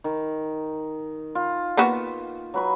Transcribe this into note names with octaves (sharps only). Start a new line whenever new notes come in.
D#3
F4
A#3 B3 F#4
F#3 B4 C#6